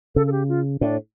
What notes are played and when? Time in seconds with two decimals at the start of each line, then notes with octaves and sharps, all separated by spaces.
0.15 C#3 A4
0.27 A4
0.32 G4
0.49 F4
0.80 A2 D4